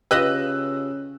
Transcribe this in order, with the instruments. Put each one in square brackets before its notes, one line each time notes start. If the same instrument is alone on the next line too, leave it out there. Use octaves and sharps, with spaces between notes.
[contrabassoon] C#3 [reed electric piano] F4 G4 [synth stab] B4 D#5 [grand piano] E6 F#6